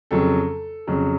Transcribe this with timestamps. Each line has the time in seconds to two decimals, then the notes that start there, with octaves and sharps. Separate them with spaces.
0.11 F2 C#3 F#3 A4
0.87 F2 C#3 F#3